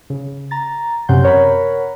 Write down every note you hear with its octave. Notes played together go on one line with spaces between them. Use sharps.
C#3
A#5 A6
F#2 C3 C#4 F#5 C6 G6
A#4 C#5 F#5 A#5 B5